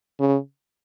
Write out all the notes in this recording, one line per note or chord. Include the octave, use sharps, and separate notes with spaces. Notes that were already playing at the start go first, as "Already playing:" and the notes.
C#3